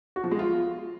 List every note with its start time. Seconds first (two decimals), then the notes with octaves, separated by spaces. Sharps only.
0.16 F#4
0.24 F3
0.31 G#3
0.39 F4